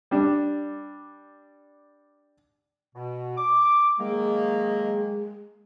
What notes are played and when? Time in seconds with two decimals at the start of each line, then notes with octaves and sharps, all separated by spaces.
0.11 G3 D4
2.95 B2
3.37 D6
4.00 D#3 F#3 G#3 A#3